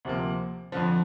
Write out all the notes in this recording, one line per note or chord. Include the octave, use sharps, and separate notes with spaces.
D2 C3 F3 A#3
F2 D3 F3